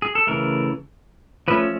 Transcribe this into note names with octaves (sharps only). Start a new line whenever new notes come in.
G#4
A4
C#3 E3 A3 A#4
F3 A3 C#4 B4